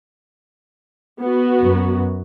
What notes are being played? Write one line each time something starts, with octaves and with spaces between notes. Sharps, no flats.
B3 F#4
F#2